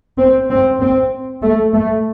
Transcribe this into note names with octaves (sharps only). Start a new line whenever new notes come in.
C4
C4
C4
A3
A3